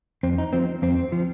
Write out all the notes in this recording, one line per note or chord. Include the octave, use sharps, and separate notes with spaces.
F2 C4
D#4
F3 C4
F2 C4
F3